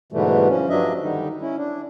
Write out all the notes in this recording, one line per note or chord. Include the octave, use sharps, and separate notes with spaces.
G#2 B2 D3 E3 G3 A3
F3 C#4
G2 F3 F#3 D4 D#5 E5
D3 D#3 G3 D#4
C#4 E4
D4